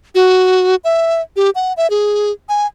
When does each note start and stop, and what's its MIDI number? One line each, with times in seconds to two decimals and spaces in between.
0.15 0.76 66
0.84 1.21 76
1.36 1.50 67
1.55 1.73 78
1.77 1.90 76
1.90 2.32 68
2.49 2.66 80